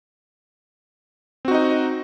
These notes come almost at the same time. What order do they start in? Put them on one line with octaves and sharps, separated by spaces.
C4 F#4 D#4 D#5